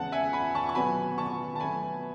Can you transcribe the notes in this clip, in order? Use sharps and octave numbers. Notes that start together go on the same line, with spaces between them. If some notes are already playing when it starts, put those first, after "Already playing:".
Already playing: E2 C#3 G#3 F#5 A5
E5 G#5
G#5 B5
A5 C#6
C#6
B2 F#3 B3 G#5 B5
A5 C#6
A5
B2 F#3 A3 G#5 B5